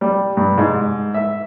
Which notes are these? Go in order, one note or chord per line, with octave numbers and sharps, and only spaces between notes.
G3
G2
G#2
E5